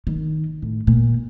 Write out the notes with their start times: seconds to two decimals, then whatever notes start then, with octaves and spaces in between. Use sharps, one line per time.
0.07 D#3
0.62 A2
0.87 A#2